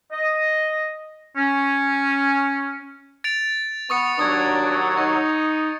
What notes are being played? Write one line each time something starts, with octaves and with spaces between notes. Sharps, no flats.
D#5
C#4
A6 D7 F7
B3 C#6 D#6 C#7
D#2 F#3 D4 D#6 G#6
D#4 C#6